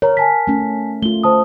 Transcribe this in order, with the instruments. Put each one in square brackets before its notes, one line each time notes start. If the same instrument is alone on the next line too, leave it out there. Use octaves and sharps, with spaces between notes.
[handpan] A#4 [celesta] C#5 A#5
[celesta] G#5 A5 B6
[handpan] A3 C#4
[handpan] A3 F4 [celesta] G7
[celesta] C5 A5 D#6